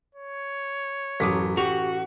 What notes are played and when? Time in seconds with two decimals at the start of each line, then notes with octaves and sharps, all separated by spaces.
0.15 C#5
1.20 A1 F#2 D6 D#6 B6
1.57 F#4 G4 C#6 F7